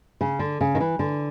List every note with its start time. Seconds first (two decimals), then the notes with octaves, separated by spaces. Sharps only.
0.21 C#3
0.39 D3
0.61 C#3
0.75 D#3
0.80 E3
0.99 D3